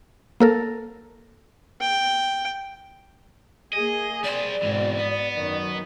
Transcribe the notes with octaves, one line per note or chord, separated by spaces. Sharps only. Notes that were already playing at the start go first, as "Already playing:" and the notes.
A#3 A4 A#4
G5
A#3 G#4 D#5
G3 C5 D5
G#2 B2 E3 C4
B3
F#2 D#3